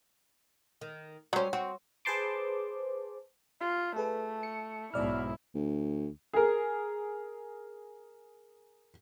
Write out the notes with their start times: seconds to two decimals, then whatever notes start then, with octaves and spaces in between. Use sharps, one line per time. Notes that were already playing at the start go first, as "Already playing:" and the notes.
0.81 D#3
1.33 F#3 G3 C#4 C5
1.53 C4 F#4
2.05 G#4 B4 C5 A5 C6 D6
3.61 F4
3.96 A3 G#4 A4 B4
4.43 C#7
4.94 B1 G#2 B2 E4 D5 F6
5.55 D2
6.34 G#4 A#4